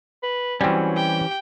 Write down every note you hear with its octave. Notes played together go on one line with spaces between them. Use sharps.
B4
E3 F#3 G3 C4 C#4
G4 G5